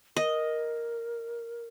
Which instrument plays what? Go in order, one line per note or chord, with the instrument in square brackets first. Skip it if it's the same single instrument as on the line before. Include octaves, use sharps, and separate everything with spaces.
[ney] A#4 [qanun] D#5